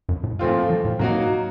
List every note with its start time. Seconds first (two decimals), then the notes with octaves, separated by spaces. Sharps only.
0.09 F#2
0.24 A2
0.39 A#2 F3 A3 C4 F4
0.70 F3
0.85 A2
0.99 A2 F#3 A#3 D#4 F#4